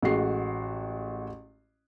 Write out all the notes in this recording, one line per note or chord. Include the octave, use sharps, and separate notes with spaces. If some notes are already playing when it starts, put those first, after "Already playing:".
A1 G#3 F#4 C7